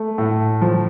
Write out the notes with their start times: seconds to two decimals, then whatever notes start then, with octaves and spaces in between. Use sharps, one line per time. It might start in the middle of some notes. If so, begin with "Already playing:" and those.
Already playing: A3
0.18 A2
0.62 F3